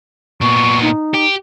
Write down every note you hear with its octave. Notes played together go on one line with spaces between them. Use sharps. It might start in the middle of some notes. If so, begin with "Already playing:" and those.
A#2 B3 C#6
D#4
G4